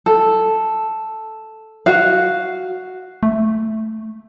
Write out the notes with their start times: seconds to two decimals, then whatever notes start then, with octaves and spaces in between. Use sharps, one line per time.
0.06 A4
1.86 F#4 F5
3.23 A3